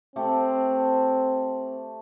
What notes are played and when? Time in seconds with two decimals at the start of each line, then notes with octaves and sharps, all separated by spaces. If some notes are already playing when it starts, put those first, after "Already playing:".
0.16 A3 C4 G4 A4